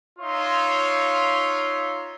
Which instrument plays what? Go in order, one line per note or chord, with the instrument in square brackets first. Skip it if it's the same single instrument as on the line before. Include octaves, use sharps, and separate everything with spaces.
[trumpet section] D#4 F4 C#5 E5 F5 C6